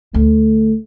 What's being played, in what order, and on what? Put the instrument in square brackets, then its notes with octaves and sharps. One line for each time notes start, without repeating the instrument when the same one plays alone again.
[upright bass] D2 [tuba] A3